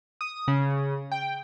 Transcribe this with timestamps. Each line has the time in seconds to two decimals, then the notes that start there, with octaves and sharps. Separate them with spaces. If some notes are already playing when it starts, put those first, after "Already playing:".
0.21 D#6
0.48 C#3
1.12 G5